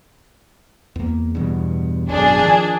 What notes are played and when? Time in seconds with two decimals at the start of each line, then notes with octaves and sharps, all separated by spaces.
0.96 E2 A#3
1.35 E2 G2 B2
2.09 G#1 F#2 B2 D4 G#4
2.42 D#3 F3